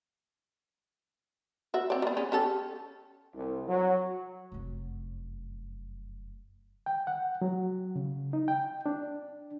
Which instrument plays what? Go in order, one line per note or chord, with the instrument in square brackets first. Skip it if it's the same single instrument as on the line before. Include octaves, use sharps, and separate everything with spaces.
[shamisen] F#4 E5
C4 D5
G3 B3
B3 C#4 G#4
C#4 G4 A4
[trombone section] C2
F#3
[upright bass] F1 F#2
[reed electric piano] G5
F#5
F#3
C#3
D#4
G5
D4